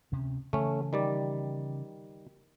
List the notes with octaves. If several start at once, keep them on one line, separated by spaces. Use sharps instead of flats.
D2 C3 C#4
C#3 E3 A3 C#4
D#3 G3 D5